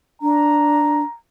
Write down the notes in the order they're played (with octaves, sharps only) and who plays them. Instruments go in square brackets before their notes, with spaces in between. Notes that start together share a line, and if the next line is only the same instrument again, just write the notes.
[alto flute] D4 [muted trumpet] A#5